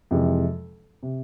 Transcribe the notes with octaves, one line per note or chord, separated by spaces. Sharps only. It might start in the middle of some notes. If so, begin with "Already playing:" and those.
F2 C3 E3 G#3
C3